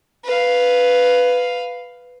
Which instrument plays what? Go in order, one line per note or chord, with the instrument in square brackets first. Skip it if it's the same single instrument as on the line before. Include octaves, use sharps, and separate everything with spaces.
[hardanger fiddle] B4 F5